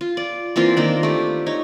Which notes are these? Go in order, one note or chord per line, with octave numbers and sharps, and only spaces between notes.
F4
D5
E3 A#3 C4 F4
D#3 A#3 D4
A3 G4
D#4 C#5